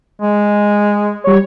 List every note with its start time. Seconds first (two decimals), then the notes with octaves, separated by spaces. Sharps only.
0.22 G#3
1.24 G3 C#5